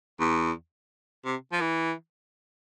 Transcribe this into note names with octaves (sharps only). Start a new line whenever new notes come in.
E2
C3
F3
E3